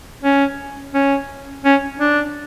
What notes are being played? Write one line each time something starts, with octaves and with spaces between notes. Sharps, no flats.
C#4
C#4
C#4
D4